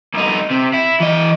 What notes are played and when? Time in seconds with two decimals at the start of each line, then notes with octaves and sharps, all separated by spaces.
0.14 C2 D#4
0.50 C3
0.73 E4
1.00 E3 D#5